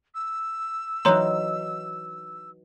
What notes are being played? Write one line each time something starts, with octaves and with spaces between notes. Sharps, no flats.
E6
E3 F#3 D#4 C#5 A#5 C6